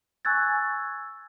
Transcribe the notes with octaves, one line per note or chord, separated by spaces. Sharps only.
G#5 C#6 E6 F#6 G#6 A6